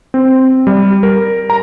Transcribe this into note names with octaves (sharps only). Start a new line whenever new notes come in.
C4
G3
A#4
A#5